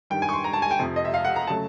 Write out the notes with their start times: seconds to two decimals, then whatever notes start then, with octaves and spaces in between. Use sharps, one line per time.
0.10 G2 D#3 G3 G5
0.22 G#5
0.29 C#6
0.33 C6
0.44 A#5
0.53 A5
0.62 G#5
0.71 G5
0.79 F2 C3 F3
0.96 D#5
1.05 E5
1.14 F5
1.25 F#5
1.36 A#5
1.47 C#3 F#3 A3 A5